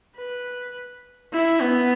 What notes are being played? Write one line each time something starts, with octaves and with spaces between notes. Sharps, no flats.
B4
E4
B3